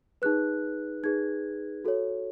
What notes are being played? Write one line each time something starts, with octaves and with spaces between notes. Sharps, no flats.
D#4 G#4 B4 F#6
D#4 G#4 B4 G#6
F#4 A4 C#5